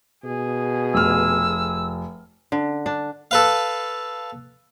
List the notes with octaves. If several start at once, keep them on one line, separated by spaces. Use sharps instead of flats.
B2 G#4
F1 E6 F6
D3
D4
A4 B4 F5